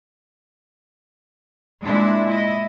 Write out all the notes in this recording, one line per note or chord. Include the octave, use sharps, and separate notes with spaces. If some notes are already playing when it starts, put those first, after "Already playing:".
A#2 G#3 D4 E4
E4 D#5